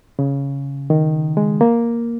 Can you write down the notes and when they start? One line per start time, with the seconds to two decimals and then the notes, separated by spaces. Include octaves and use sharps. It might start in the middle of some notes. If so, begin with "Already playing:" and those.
0.19 C#3
0.90 D#3
1.37 G#3
1.61 A#3